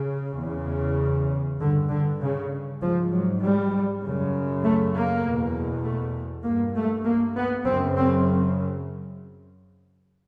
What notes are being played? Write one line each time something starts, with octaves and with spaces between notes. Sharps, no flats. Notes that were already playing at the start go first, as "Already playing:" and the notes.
Already playing: C#3
E2 C#3
G2 D3
D3
C#3
G#2 F3
F#3
G3
F#2 C#3
A3
A#3
E2 B2
A3
G2 A#3
A3
A#3
B3
F#2 C#3 C4
C4